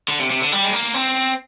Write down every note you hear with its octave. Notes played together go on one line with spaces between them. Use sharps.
D3
C3
C3
D3
G3
G#3
A#3
C4